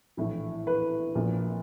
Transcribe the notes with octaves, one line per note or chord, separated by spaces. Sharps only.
A#1 A2 E3
B4
A#1 A#2 F3